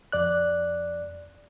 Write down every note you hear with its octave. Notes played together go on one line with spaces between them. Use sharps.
F2 D5 F#6